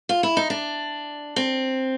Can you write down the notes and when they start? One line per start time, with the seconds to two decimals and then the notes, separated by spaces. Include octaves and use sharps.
0.09 F4
0.23 E4
0.37 D#4
0.50 D4
1.36 C4